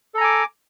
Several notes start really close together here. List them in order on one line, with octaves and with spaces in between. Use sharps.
A4 A#5 G#5 D6